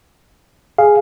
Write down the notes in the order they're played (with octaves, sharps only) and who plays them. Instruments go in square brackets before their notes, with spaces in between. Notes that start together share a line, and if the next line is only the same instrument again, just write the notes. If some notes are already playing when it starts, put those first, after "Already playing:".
[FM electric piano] G#4 [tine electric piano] F5